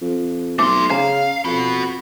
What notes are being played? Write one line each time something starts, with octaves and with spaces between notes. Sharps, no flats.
F2
B1 A3 C6 D6
C#3 F5 A#5
F2 F#4 B5